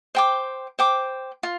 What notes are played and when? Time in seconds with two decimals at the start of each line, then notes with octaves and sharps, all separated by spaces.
0.15 C5 G5 D6
0.79 C5 G5 D6
1.43 F4